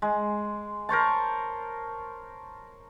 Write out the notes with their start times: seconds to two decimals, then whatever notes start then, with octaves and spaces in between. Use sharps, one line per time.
0.02 G#3
0.89 A#4 C5 C#5 A5